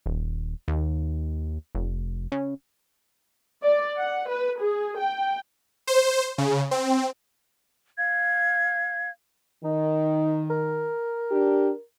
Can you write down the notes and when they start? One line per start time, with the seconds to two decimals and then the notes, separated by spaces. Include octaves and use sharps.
0.06 D#1
0.68 D#2
1.75 F1
2.32 C#3
3.62 D5
3.97 F#5
4.28 B4
4.62 G#4
4.98 G5
5.87 C5
6.38 C#3
6.71 C4
7.97 F5 G#6
9.64 D#3 D#4
10.50 A#4
11.31 D4 G4